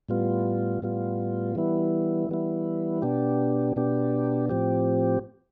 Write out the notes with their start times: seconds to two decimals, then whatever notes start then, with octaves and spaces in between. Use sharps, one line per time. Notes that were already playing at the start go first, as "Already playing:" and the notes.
0.09 A2 G3 B3 F4
0.82 A2 G3 B3 F4
1.55 E3 G3 B3 E4
2.29 E3 G3 B3 E4
3.02 B2 B3 D4 G4
3.76 B2 B3 D4 G4
4.49 A2 F3 C4 G4